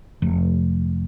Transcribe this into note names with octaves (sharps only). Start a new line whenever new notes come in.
F1